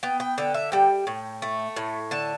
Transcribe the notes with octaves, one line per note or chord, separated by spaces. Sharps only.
B3 G5
G5
D3 G5
E5
G3 G5
A2
A3
A2
D3 A5